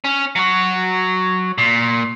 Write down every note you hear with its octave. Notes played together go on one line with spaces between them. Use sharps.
C#4
F#3 F#4
A#2